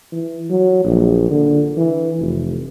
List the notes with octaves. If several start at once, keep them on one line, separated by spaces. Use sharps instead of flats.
E3
F#3
A#1
D3
E3
F1